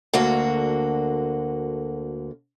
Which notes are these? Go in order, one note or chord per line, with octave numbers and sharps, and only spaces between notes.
D2 D3 A#3 F#4